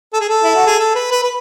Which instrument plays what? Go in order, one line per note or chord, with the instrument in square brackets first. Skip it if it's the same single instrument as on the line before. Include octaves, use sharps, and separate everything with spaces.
[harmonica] A4
G#4
A4
E4
F#4
G#4
A4
B4
B4
B4